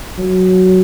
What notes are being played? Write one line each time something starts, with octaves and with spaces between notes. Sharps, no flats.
F#3